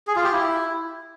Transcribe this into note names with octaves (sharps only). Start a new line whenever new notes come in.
G#4
F4
G4
E4